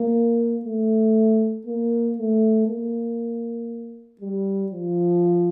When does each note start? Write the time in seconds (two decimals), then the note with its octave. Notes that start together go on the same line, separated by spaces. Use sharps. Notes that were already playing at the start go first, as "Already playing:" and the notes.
Already playing: A#3
0.65 A3
1.67 A#3
2.18 A3
2.68 A#3
4.21 G3
4.72 F3